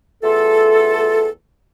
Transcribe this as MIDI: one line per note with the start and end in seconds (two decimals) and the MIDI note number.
0.22 1.28 40
0.22 1.28 57
0.22 1.28 65
0.22 1.28 69